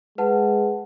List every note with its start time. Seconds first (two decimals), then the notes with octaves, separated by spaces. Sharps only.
0.18 G#3 B4 F#5 A5